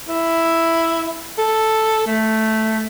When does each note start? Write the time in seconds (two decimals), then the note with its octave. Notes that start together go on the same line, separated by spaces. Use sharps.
0.09 E4
1.38 A4
2.07 A3